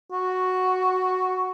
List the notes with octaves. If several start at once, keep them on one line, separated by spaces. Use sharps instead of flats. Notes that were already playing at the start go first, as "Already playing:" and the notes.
F#4